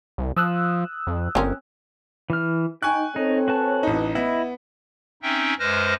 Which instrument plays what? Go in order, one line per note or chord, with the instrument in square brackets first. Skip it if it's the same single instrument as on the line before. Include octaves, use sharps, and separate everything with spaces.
[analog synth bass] C2
[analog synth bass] F3 [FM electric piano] D#6 E6 F#6
[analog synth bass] F2
[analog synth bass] G1 [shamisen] C4 C#4 A#4
[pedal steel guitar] E3 F6
[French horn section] D#4 [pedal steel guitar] G5 [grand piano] G#5 C#6 F#6
[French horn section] C4 A4 C#5 [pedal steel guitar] D#4
[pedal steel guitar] F#4 B4 A5
[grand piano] A1 D#4
[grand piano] B3 [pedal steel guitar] E4 D#5
[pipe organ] C4 C#4 D#4 E5 G5
F#2 G#3 B4 C5 F6 A#6